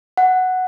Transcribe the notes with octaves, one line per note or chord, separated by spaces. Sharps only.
F#5